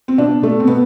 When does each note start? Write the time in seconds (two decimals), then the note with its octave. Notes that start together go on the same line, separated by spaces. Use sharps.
0.08 C4
0.18 B2 D4
0.42 B2 A3
0.60 C4
0.67 B2 B3